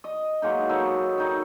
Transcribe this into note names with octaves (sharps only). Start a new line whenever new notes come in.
D#5
F#3 G#3 A#3 D#4
D#4 A4 B4 C#5
D#3 D#4